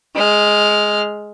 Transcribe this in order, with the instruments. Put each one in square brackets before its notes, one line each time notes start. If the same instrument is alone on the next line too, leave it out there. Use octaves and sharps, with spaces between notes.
[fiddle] G#3 F6